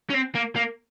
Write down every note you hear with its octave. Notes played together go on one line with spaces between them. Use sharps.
C#4
C4
A#3
A#3